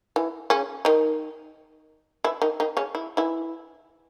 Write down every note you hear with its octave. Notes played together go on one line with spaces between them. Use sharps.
E3
C#3 C#4
D#3 D#4
E3 E4
D#3 D#4
D#3 D#4
C#3 C#4
E4
E3 E4